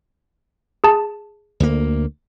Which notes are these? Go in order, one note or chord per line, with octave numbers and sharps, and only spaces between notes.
G#4 A5
D2 A#3